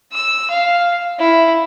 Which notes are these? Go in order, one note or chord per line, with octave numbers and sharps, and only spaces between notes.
E6
F5
E4